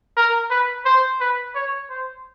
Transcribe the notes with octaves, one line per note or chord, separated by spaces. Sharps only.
A#4
B4
C5
B4
C#5
C5